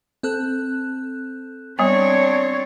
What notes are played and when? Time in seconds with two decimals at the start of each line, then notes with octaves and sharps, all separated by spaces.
0.23 C4 A4 F#6
1.79 G3 B3 C4 D4 C#5